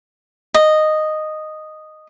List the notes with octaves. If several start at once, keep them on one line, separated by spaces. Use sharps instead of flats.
D#5